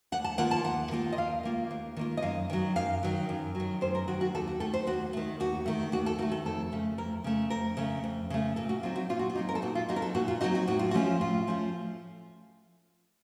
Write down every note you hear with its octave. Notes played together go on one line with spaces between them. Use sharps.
D#2 F#5
A5
D#3 A#3 F4 F#5
A5
D#2 F#5
D#3 A#3 F4
D#5
D#2 F5
D#3 A#3 F4
D#2
D#3 A#3 F4
D#5
F#2 F5
D#3 F#3
F#2 F5
D#3 F#3
F#2
F#3
D#3
F#2 C5
A#4
D#3 F#3 F#4
F#4
D#2 A4
F#4
D#3 A3 A4
C5
D#2 F#4
D#3 A3
D#2 F#4
D#3 A3
D#2 F#4
A4
D#3 A3 F#4
A4
F2 A4
C#3 A3
F2 A#4
C#3 A3
F2 A#4
C#3 A3
F2
C#3 A3
A#2 A4
F#4
F#3 C4 D#4 F4
F#4
A#2 F4
F#4
F4
F#3 C4 D#4
A#4
A4
A#2 F#4
F4
F#3 C4 D#4 F#4
A#4
A4
A#2 F#4
F4
F#3 C4 D#4 F#4
F#4
A2 F#4
F4
F#4
F3 A3 C#4 F4
A2 F4
F3 A3 C#4 F4